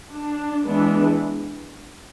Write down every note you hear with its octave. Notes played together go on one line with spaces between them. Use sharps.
D4
E3 G#3 B3 D4